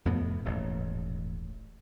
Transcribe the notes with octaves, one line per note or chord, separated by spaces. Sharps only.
F2 A2 C3 B3
D#1 A1 G#2